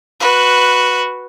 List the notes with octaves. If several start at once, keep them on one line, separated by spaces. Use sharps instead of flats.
F#4 B4